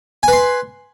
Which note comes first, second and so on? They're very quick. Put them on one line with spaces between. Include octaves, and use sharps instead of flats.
G#5 B4 C6